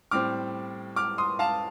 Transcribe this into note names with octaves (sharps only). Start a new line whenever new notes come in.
A2 G3 C4 D6 F6
D6 F6
C6 D#6
F5 A5